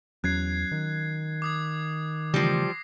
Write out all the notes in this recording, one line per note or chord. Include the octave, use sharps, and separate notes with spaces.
E2 F#3 C#4 F#6 G#6 C7
D#3
D6 D#6 G#6
C#3 E3 F3 G3 A3 D6 A#6 C7